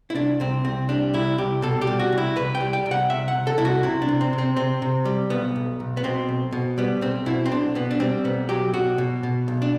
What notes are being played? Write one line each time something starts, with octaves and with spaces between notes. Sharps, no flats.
E4
C2 D4
C2 C4
C2 C4
G3 D4
C2 E4
C2 G4
B2 A4
G4
G3
F#4
C2
E4
C2 B4
G5
G3
G5
C2
F#5
C2 E5
F#5
C3
A4
C2 E4
F#4
C3 E4
D4
C3
C4
C3
C4
C3 C4
C3
G3
B1 B3
B1
B1
B3
B2 C4
B1
B2
G3 B3
B1 C4
B2 E4
C4
B1 D4
B2 B3
D4
G3 C4
B1 B3
F#3 G4
B2 F#4
B2
B2
B1
D4